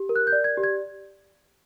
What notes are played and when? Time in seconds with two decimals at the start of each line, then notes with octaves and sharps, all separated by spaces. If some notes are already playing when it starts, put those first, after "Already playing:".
Already playing: G4
0.09 A#4
0.16 F#6
0.27 G6
0.32 D5
0.44 G#6
0.57 G4
0.63 G#6